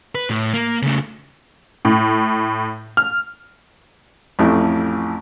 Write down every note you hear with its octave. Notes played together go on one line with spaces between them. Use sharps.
B4
A2
A#3
C#3 A3
A2
F6
A1 F2 A2